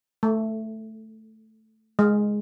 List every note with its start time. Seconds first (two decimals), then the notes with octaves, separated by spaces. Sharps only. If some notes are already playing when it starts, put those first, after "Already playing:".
0.23 A3
1.99 G#3